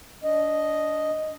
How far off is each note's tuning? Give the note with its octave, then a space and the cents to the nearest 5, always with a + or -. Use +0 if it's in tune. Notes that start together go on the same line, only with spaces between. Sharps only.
D4 -25 D#5 +0